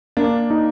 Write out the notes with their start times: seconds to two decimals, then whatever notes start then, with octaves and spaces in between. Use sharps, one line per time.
0.17 A#3 D4
0.50 D#4